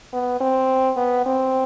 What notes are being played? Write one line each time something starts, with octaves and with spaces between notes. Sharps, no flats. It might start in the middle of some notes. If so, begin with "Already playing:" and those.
B3
C4
B3
C4